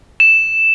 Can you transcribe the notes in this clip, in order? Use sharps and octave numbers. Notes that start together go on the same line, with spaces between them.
E7